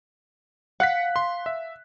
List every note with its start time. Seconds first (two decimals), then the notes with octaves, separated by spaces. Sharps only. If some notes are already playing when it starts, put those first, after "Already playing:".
0.80 F5 F#5 F#6 B6
1.16 C6
1.46 E5